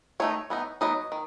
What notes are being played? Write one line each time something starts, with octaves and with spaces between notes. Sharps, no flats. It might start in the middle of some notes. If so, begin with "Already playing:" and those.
D#3 A3 D#4 C#5
E3 B3 D#4
F#3 B3 D#4 D#5
D#3